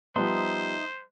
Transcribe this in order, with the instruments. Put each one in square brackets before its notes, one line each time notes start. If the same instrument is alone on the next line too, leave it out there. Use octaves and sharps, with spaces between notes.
[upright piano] F3 G3 B3 [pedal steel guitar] D#4 E5 C6 [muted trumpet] C5